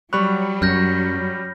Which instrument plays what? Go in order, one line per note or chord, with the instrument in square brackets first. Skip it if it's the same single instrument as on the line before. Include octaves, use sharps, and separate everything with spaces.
[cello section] F#3 [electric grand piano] G3 C#6 F#6 [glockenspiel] B5
[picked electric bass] F#2 [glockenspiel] F6 G6 A#6